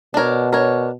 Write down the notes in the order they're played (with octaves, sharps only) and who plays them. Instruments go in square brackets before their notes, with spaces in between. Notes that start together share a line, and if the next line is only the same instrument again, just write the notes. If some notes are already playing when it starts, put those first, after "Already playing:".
[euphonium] B2 [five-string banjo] D4 A#4 C#5
[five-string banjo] D4 A#4 C#5